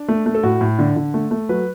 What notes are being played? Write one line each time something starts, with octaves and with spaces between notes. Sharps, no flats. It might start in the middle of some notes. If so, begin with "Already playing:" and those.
Already playing: D4
A3
A3
A4
A2 F#4
A2
D3
D3
A3
A3
F#3 B4